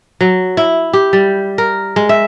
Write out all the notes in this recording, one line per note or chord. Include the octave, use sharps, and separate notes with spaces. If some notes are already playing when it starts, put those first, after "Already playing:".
F#3
E4
G4
G3
A#4
G#3
E5